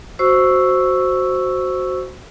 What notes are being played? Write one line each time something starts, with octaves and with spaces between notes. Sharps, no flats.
F#4 C5 C#6 E6